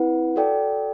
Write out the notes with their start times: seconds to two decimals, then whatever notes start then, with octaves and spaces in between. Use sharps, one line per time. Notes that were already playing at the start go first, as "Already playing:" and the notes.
Already playing: C4 E4 B4 F#5
0.36 F#4 A4 D5 G5